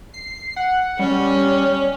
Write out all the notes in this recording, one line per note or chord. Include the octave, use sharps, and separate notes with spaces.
C7
F#5
G3 C#4